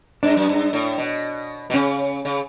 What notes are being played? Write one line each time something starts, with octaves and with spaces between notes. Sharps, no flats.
G2 D4
F#2
G2
A2
B2
B2
C#3 C#4
C#3